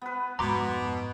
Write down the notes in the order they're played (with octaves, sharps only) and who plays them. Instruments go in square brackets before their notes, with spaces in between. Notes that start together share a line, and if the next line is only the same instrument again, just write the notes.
[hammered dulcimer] B3 B4
[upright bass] F2 G#2 [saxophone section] B2 [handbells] A#5 C6 D6